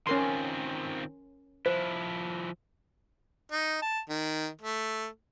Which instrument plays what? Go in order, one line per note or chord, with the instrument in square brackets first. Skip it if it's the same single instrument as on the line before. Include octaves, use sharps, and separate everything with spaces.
[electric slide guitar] D#3 C4 F4 [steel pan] C#4 A#4 C6
[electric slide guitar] F3 E4 [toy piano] C5
[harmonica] D#4
A5
D#3
A3